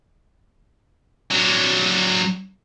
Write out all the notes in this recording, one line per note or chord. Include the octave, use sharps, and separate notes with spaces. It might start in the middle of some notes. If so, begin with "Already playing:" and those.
F#3 D4